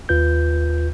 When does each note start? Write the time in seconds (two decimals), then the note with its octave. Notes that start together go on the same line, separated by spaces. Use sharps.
0.09 D#2 F4 B4 G6